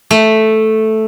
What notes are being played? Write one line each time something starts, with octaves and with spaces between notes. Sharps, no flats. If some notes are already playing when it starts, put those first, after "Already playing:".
A3